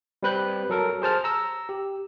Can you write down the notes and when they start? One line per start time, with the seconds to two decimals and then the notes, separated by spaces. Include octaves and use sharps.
0.23 G3 C4 B4 F#6 G6
0.70 F#3 A4 A#4
1.02 G#4 C5 A5 F6
1.24 A#5 E6
1.69 G4